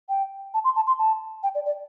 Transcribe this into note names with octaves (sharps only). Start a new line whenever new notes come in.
G5
A5
C6
A5
C6
A5
G5
D5
D5